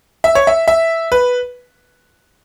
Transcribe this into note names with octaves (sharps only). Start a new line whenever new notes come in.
E5
C#5
E5
E5
B4